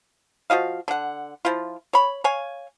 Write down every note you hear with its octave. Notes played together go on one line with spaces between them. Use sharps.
F3 F#4 D#5 F5
D3 F#5
F3 E4 F4
C#5 B5
C#5 F5 G#5